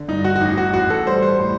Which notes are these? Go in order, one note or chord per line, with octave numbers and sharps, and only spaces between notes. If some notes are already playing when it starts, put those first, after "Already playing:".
Already playing: D3
G2 D#4
F#4
F#4
A1 D#4
F#4
A1 F#4
A4
G3 C5
C5
A2